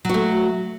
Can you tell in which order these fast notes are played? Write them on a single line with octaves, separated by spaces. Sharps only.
F#3 F#4 A3